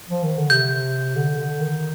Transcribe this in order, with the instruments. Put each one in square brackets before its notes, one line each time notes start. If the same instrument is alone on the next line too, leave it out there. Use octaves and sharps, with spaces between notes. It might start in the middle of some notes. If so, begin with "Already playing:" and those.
[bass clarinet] F3
D#3
D3
[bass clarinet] C3 [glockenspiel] G6
[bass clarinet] D3
D3
D#3